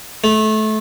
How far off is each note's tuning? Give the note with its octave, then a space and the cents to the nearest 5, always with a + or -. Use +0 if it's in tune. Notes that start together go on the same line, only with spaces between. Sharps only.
A3 -25